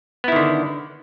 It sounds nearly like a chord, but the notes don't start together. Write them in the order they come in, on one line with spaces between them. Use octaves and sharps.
B3 E4 D#3 D3